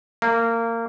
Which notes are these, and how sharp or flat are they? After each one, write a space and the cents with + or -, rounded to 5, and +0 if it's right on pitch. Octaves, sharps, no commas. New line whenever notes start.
A#3 -20